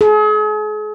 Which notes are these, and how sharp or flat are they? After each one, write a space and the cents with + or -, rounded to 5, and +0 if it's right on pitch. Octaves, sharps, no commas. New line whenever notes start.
G#4 +40